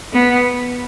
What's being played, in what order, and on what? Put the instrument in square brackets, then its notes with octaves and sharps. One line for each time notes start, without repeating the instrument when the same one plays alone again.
[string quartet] B3